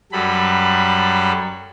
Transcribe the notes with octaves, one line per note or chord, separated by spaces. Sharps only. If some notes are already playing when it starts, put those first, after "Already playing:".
F#2 F#3 G3 A4 B5